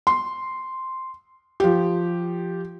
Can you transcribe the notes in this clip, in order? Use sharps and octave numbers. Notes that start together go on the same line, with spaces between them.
C6
F3 G4